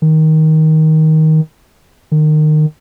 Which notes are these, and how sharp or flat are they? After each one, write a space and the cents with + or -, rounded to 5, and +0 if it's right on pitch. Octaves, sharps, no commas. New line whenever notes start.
D#3 +15
D#3 -25